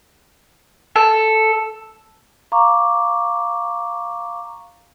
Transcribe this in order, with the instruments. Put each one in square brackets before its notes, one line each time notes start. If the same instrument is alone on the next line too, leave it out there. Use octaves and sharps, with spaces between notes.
[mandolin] A4
[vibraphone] F5 A#5 C#6 D6